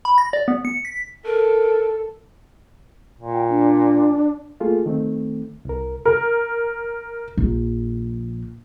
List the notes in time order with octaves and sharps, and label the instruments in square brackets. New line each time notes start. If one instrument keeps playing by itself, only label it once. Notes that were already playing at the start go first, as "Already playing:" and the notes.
[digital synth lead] B5
A#6
D5
B3
C#7
B6
[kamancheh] A4 [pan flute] A#4
[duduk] A#2
[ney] G5
D4
[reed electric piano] A3 A#3 F4 G#4 A4
D#3 A3 C4
C2 A#4
[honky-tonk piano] A#4
[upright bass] A#1